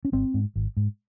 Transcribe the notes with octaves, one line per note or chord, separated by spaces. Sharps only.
C#4
G#1 C4
G#2
G#1
G#2